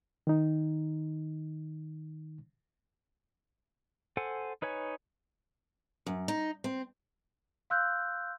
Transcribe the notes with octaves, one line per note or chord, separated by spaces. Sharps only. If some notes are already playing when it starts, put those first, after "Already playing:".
D#3 D#4
A4 C5 F#5 G#5
D#4 B4 C#5 G#5
F#2
D#4
C4
F5 C6 E6 F#6 G6